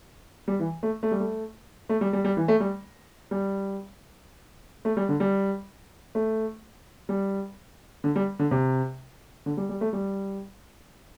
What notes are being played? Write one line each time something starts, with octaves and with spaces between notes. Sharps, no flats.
G3
E3
A3
A3
G3
A3
A3
G3
G3
G3
E3
A3
G3
G3
A3
G3
D3
G3
A3
G3
D3
G3
D3
C3
D3
G3
G3
A3
G3